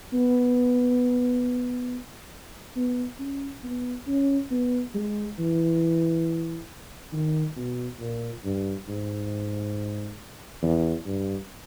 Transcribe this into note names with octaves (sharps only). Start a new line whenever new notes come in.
B3
B3
C#4
B3
C#4
B3
G#3
E3
D#3
B2
A#2
G2
G#2
E2
G2